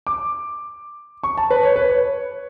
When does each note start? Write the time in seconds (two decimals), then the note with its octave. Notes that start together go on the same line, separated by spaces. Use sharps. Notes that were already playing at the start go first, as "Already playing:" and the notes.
0.07 D6
1.23 C#6
1.37 A5
1.50 B4
1.63 C#5
1.76 B4
1.89 C#5